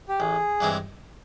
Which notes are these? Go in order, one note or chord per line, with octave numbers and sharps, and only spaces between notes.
G4
A1 G#4
G2 E3 G#3 C4